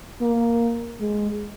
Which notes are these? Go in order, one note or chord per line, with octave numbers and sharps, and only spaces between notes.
A#3
G#3